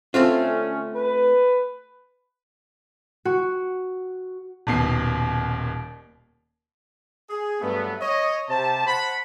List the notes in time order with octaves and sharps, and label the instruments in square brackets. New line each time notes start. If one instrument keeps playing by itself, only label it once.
[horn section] D3 C#4 [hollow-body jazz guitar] A3 C4 F4
[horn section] B4
[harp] F#4
[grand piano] D#1 D#2 B2 C7
[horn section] G#4
G2 F#3 A3 B3
C#5 D#5
C3 G4 C5 A5
C5 F#5 A5 B5